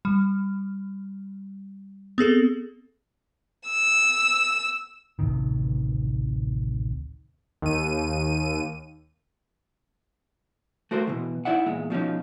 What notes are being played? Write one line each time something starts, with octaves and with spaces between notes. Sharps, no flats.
G3
B3 C4 G#4 A4
E6
A1 D2 C3 D#3
D#2 D#7
A3 F#4 A#4 C5
B2 E3
D#4 E4 D5 E5 F#5
E2 A#2 G#3
B2 F3 C#4 D#4